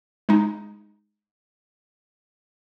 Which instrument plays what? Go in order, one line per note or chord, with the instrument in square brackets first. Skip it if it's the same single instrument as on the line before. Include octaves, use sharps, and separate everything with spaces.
[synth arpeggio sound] G#3 D#4